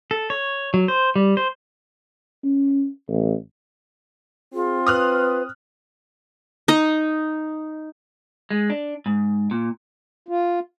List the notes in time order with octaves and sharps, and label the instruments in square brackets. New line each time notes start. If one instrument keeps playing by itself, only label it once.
[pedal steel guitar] A4
C#5
F#3
C5
G3
C5
[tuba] C#4
A1
[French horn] C4 [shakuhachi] F4 [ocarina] G#4
[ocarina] B4 [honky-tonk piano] D#6 F6 F#6
[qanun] D#4 D#5
[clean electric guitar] G#3
D4
G#2
A#2
[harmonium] F4